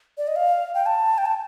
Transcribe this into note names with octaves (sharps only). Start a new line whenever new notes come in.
D5
D#5
F5
G5
A5
G5
A5